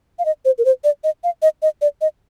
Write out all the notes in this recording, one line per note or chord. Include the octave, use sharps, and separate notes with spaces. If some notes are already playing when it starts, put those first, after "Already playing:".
F5
D#5
C5
A#4
C5
D5
D#5
F5
D#5
D#5
D5
D#5